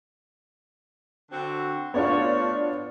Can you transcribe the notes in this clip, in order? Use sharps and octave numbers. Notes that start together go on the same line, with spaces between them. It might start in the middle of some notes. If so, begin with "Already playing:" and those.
D3 C4 F#4
A3 B3 D4 F4 F#4 C#5